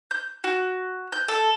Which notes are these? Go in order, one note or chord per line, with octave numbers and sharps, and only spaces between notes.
G6
F#4
G6
A4